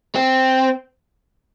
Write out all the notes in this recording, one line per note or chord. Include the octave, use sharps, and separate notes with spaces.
C4